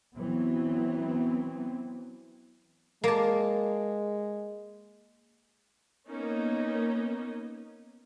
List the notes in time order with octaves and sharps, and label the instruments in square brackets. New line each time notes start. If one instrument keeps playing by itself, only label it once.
[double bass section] E3 F#3 B3 C4
[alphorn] G#3 [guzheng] A#3 A5
[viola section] A#3 B3 C#4 D#4